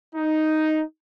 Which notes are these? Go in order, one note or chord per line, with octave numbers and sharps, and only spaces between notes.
D#4